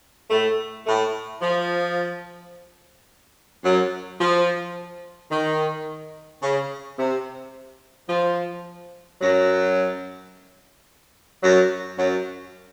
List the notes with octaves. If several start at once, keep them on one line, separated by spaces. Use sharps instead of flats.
A2 A3
A2 A3
F3
F#2 F#3
F3
D#3
C#3
C3
F3
F#2 F#3
F#2 F#3
F#2 F#3